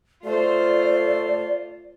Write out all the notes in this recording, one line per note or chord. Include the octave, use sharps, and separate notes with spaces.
A3 F4 C5 D5